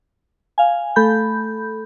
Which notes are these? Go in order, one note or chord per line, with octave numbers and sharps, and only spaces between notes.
F5 G#5
A3 A4 B5 G6